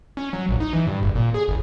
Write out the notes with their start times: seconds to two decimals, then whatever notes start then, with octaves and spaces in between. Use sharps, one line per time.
0.17 C#4
0.33 F#3
0.49 A#1
0.60 D#4
0.73 E3
0.87 G2
1.03 F#1
1.15 A#2
1.34 G#4
1.48 G1